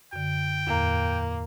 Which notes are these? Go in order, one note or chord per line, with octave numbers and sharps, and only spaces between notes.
F#2 D3 G5
E2 A2 A#3 A#5